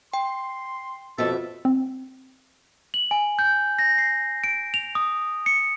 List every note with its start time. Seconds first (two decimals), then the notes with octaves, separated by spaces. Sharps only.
0.14 G5 C6
1.18 F2 B2 A4 E5
1.65 C4
2.94 F#7
3.11 G#5
3.39 G6
3.79 A#6
3.98 C7
4.44 D7
4.74 F7
4.95 D#6
5.46 C#7